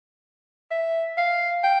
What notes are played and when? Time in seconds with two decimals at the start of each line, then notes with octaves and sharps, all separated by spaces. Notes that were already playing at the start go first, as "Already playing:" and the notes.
0.71 E5
1.18 F5
1.64 G5